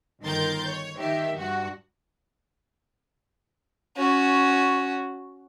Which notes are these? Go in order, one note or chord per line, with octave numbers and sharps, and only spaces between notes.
G1 D#3 A#4 C6 G6 A6
C#5
D#3 G4 E5
G2 F#4
C#4 F#4